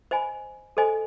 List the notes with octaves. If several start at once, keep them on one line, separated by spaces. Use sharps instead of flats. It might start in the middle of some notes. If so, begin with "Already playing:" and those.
C5 D#5 G#5 B5
A4 C5 D#5 G#5